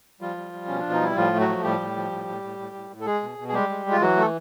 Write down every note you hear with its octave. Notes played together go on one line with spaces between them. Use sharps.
F3 G3 F4
G3
G3
B2 C#4
B2 D4
D#4
G3 E4
A2 F3 F4
A3
F#3 F#4
F3
A2 G3 G4
A2
F3
A2
A2
A2
A2
A2
A2
A4
G#3 G#4
B2
B2
G#4
G3 G#3 G4
G#3
G#3
F4
E3 F#3 F#4
A3 A4